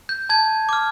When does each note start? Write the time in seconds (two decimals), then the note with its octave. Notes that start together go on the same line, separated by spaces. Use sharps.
0.09 G6
0.29 A5 G#6
0.69 D6 F6